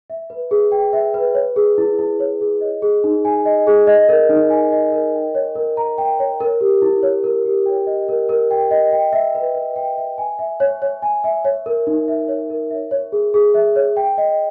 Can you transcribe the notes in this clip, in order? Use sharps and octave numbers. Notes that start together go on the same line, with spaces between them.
E5
B4
G#4
G5
E5
B4
C#5
G#4
E4
E4
C#5
G#4
D#5
G#4
D#4
G#5
D#5
G#4
D#5
A#4
D#4
G#5
D#5
A#4
G5
C#5
A#4
A#5
G5
C#5
A#4
G4
E4
C#5
A#4
G4
G5
D#5
A#4
A#4
G5
D#5
G5
E5
B4
B4
G5
E5
G#5
E5
C#5
C#5
G#5
E5
C#5
A#4
D#4
E5
C#5
A#4
E5
C#5
G#4
G#4
E5
C#5
G5
D#5